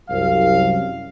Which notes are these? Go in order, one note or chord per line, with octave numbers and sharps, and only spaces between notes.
C2 F#2 F5